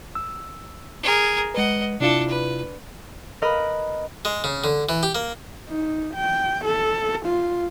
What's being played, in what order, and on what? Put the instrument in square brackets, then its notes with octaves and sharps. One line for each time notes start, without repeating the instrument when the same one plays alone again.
[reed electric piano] E6
[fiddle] G#4 A#4
[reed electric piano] G#3 B4 [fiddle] D#5 F#5
[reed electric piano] C3 E4 F4 [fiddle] D4 A4
[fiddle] B4
[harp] A#4 B4 D#5 B5 F6
[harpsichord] G#3
C#3
D3
E3
G4
A#3
[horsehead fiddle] D#4
G5
A4
F4